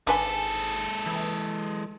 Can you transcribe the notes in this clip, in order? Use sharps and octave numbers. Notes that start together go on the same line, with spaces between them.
G#1 G#3 D4 A4 B4 G#5
E3